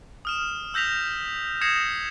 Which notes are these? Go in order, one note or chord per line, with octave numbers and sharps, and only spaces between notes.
D#6 F6 E7
E6 G6 A#6 B6 F7
D#6 G#6 A#6 C7 C#7 E7